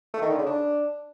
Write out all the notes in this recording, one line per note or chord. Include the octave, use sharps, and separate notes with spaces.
A3
D#3
D3
C#3
D4